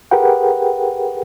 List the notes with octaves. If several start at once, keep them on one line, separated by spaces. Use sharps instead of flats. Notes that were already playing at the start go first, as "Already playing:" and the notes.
G4 G#4 A#4 B4 F#5 G5